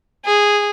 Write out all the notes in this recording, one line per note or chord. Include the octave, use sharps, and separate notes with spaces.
G#4